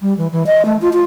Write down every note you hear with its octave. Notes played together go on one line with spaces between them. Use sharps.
G3
E3
E3
D#5
A3
F4
F4